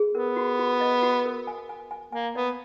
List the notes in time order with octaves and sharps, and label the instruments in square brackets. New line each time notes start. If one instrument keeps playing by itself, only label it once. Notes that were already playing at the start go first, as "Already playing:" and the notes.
Already playing: [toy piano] G#4
[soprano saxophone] B3 [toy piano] A#4
[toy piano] F#4
F#4
D#5
F#4
A#4
G#5
G#5
G#5
[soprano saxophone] A#3 [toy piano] G#5
[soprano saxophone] B3 [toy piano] D5